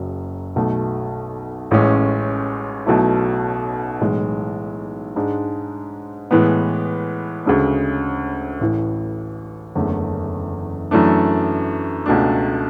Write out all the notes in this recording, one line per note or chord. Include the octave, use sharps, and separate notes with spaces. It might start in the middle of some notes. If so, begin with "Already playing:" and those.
Already playing: F#1 F#2 C#3 F#3 C#4
B1 B2 A3
A1 A2 G#3 C#4
B1 B2 F#3 A3 E4
B1 A2 E3 G#3
G#2 G#3 D4
A2 E3 G#3 B3
D2 C#3 G#3
A1 A2 E3
F#1 E2 D3 A3 C#4
F#2 E3 A3 D4
C#2 B2 A3 D4